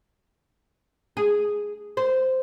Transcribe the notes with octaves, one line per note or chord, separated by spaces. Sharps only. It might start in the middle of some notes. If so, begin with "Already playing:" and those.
G#4
C5